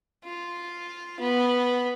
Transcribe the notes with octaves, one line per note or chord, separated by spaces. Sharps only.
F4
B3